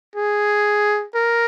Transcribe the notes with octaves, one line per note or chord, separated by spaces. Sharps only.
G#4
A#4